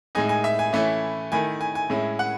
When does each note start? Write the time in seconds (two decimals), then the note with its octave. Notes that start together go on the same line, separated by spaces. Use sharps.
0.15 A2 G#3 D#4 G#5
0.29 G#5
0.44 E5
0.59 G#5
0.73 E3 A3 C#4 E4
1.32 D#3 A3 E4 G#5
1.61 G#5
1.75 G#5
1.90 A2 G#3 C#4 E4
2.19 F#5